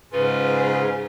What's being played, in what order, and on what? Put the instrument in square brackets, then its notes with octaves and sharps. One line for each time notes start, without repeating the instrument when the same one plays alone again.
[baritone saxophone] G#2 [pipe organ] C#3 C#4 F4 [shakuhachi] B4